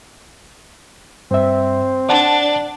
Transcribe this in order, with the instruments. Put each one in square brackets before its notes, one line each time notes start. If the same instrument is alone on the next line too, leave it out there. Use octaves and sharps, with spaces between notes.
[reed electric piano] G2 E5 [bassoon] C4
[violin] D4 [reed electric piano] D5 F#5 A5